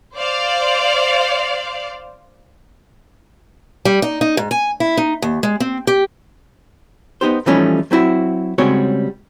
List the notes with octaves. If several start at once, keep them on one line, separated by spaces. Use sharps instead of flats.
C5 D5 F5
G3
D#4
D#4
G#2
G#5
E4
D#4
D#2
G#3
C4
G4
B3 D#4 G4 C5
E3 F3 G3 A3 C#4 D#4
F#3 C4 E4 F#4
C#3 G3 G#3 C4 F#4 C#5